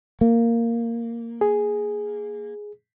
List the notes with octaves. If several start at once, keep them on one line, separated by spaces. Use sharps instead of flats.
A#3
G#4